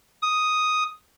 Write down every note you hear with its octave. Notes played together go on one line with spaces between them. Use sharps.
D#6